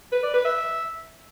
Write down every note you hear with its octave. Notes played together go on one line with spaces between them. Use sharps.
B4
D5
B4
E5